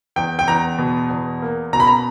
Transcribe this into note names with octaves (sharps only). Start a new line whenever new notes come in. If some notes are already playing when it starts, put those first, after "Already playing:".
E2 G5
G5
E2 A#5
B2
E2
A#3
B2 A#5
B5
A#5